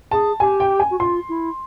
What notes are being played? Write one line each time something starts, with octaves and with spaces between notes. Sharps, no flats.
G#4 A5
G4 G#5
G5
G#5
F#4
F4 C6
E4